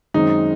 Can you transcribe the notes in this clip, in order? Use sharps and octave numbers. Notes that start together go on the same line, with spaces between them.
F#2 D#3 G#3 C4 D#4